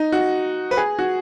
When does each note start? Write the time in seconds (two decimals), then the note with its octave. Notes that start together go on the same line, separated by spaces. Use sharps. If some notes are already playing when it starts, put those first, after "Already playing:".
Already playing: D#4
0.12 F#4
0.71 B4
0.77 G#4
0.99 F#4